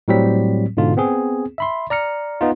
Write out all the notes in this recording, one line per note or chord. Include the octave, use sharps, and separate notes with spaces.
A2 F#3 G3 C4 B6
G#2 B2 D3 F4
B3 C4 G#4
E5 B5 C6
D5 A#5 F6 C#7
B3 D#4 F4